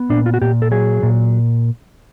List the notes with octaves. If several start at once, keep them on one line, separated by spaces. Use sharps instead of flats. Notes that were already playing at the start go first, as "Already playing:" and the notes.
Already playing: B3
A#2 D4
F4
F#4
A#2 G4
A4
F#3 G#4
A#2